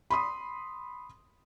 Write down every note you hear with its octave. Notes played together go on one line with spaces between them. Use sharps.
B5 C6 D#6